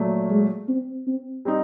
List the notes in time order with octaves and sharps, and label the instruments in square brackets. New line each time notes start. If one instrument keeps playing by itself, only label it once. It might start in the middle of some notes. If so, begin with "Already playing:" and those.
Already playing: [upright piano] A#2 F#3 A3
[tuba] G#3
C4
C4
[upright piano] G3 C4 D#4